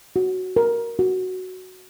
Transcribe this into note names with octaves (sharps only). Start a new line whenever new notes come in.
F#4
A#4
F#4